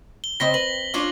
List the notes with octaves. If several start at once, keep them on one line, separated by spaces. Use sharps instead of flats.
G7
C#3 C4 D#5 A#6 B6 G7
B4 F#7
C#4 D4 F4